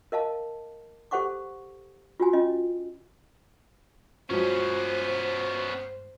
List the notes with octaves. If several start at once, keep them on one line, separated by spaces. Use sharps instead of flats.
A#4 D#5 F5 A5
G4 A4 C5 F#5 C#6 D6
F4 F#4 G#5
C#4 F4 D#5
G2 F3 F#3 G#3 B3 C#4 C5